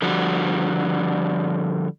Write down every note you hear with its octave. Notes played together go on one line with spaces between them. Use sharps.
D3 F3 G3 F#4